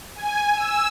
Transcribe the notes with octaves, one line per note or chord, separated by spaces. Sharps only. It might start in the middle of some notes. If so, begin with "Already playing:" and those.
G#5
E6